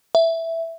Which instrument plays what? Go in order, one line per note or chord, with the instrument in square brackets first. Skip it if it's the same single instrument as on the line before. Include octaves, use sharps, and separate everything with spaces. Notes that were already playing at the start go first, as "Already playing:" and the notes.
[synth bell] E5